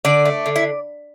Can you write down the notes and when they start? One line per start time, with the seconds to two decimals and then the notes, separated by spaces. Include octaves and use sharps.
0.05 D3 D5
0.25 A3
0.46 D3
0.56 E4